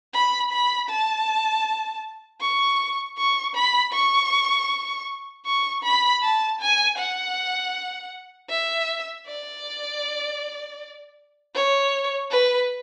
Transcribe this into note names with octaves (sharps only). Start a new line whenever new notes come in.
B5
B5
A5
C#6
C#6
B5
C#6
C#6
B5
A5
G#5
F#5
E5
D5
C#5
B4